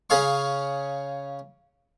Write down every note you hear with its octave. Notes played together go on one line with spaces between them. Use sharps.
C#3 C#4 G#4 F5 C#6